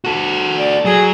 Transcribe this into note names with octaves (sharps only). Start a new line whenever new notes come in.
F#4 A4
D5
F#3 G#4